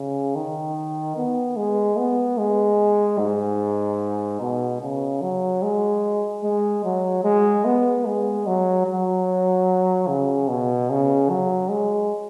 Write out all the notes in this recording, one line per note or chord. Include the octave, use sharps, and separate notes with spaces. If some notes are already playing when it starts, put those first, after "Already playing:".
Already playing: C#3
D#3
B3
G#3
B3
G#3
G#2
B2
C#3
F#3
G#3
G#3
F#3
G#3
B3
G#3
F#3
F#3
C#3
B2
C#3
F#3
G#3